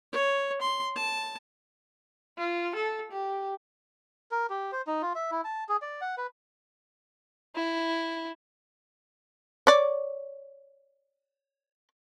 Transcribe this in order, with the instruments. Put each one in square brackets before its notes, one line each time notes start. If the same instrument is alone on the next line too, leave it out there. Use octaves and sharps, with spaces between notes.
[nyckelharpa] C#5
C6
A5
[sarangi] F4
A4
G4
[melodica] A#4
G4
C5
D#4
F4
E5
E4
A5
G#4
D5
F#5
B4
[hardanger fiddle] E4
[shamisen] C#5 D5